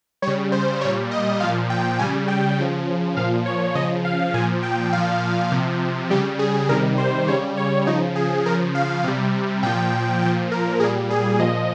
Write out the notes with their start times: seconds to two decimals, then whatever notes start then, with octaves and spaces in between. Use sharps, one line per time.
0.22 C#3 G3 C#5
0.52 C5
0.81 A#2 G3 C#5
1.11 D#5
1.40 A#2 F3 F5
1.70 G5
1.99 C#3 G3 G#5
2.28 G5
2.58 C#3 F3
3.17 A#2 F3 F5
3.46 C#5
3.75 C#3 F3 D#5
4.05 F5
4.34 A#2 F3 G#5
4.63 G5
4.93 A#2 F3 F5
5.52 C3 F3
6.10 C#3 G3 G4
6.39 G#4
6.69 C3 D#3 G3 A#4
6.98 C5
7.28 C#3 G3 C#5
7.57 C#5
7.86 C#3 F3 D#4
8.16 G#4
8.46 C#3 F3 A#4
8.75 F5
9.04 C3 G3
9.63 A#2 F3 G5
10.22 A#2 F3 G5
10.52 A#4
10.80 A#2 G3 G#4
11.10 G#4
11.39 A#2 F3 D#5